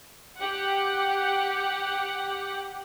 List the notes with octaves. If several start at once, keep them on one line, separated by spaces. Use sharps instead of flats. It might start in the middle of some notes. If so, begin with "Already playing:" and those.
G4 F#5